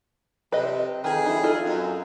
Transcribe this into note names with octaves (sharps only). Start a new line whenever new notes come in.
C3 B4 D#5
F2 D#3 G#4
D#4 E4
F4 A4 D#5
F#2